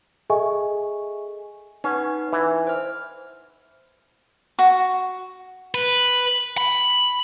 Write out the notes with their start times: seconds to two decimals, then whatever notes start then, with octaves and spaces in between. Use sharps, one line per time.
0.30 G#4 A4 D#5 E5 G#5 C#6
1.84 C#4 D#4 B4 F#5
2.33 E3
2.67 C5 F6
4.59 F#4
5.75 B4
6.58 B5